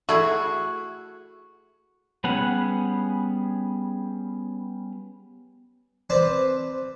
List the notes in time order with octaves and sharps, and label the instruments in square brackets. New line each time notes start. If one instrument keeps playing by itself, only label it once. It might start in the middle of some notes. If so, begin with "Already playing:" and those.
[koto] A3 E4 G#4 [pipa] F#4
[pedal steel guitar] G3 B3 C#4 G#4 F#5
[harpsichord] C4 B4 D5 A5